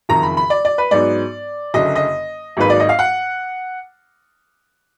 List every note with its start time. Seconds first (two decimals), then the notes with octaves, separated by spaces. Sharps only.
0.09 F#1 F2 D#3 A#5
0.23 B5
0.37 B5
0.50 D5
0.65 D5
0.78 B4
0.91 G#2 F#3 B3 D#4 D5
1.74 F#1 F#2 D3 D#5
1.96 D#5
2.57 G#1 G#2 F#3 A#3 D#4 B4
2.70 D5
2.80 D#5
2.89 F5
2.99 F#5